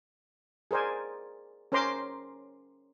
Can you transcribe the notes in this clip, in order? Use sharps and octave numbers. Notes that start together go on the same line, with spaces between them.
G#4 A#4 C5 D5 G#5
C#4 A#4 C5 A#5 C6 D6